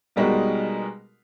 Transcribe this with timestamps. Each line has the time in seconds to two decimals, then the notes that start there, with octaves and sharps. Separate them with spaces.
0.16 B2 G3 G#3 D#4 F#4 A#4